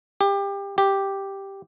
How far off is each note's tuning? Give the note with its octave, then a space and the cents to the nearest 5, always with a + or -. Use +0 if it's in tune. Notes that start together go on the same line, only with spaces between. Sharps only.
G4 +25
G4 +0